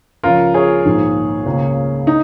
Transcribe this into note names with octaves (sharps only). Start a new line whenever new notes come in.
C#2 C#3 F3 F4 A#4
G#4 C#5
A#1 G#2 D#3 A#3
C#2 C#3 A#3
D#4